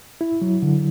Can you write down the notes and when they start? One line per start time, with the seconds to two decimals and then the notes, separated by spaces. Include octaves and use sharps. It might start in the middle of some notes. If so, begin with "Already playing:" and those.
0.21 E4
0.42 F#3
0.62 D3